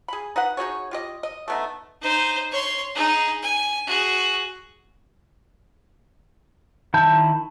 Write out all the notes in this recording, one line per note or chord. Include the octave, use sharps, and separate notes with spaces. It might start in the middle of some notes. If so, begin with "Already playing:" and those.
G#4 B5
D#4 B4 F#5
D#4 F#4 G#4 C#5
F4 G4 D#5
D#5
A3 B3 D#4
D#4 C5
C#5 C6
D#4 G#4
G#5
F#4 G#4
D#3 E4 A5 G6